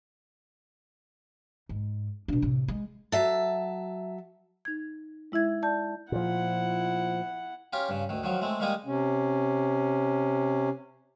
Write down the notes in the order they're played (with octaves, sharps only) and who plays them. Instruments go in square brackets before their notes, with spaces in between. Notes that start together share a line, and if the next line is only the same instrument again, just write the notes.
[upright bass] G#2
B2 D4
A2 C3
G#3
[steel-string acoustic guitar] F#3 E5 A5
[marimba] D#4 G#6
G#3 E4 E5 G#6
D5 A5 G6
[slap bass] A#2 F3 [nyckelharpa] E4 F#5
[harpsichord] C#4 F4 G4
G2 C#3
D2 D#3
D#3 F3 F#3
G#3 A3 C4
D#3 G3 G#3 A#3 D#4 D#6
[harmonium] C3 C#4